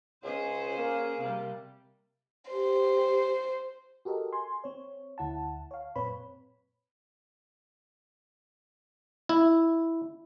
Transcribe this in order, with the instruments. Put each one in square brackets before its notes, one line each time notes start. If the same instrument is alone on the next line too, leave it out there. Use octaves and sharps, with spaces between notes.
[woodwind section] C#2 [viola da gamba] C#4 G#4 C5
[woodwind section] A#3
[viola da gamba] C3 G3
[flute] G4 [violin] C5
[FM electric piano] F#4 G4 A4 A#4 D#5
G#5 C6
C4 C#5
D2 E4 F#5 A5
C#5 F5
F#2 A#2 C4 B4 C#5 B5
[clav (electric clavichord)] E4